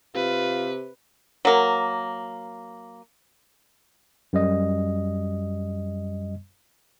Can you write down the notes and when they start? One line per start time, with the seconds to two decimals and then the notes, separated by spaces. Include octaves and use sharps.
0.15 C3 F4 B4
1.45 F#3 A#3
4.33 F#2 G3 D#5